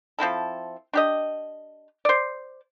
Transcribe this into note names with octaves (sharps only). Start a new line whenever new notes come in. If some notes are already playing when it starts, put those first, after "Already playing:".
F3 C4 E4 A4
D4 G4 D#5
C5 D5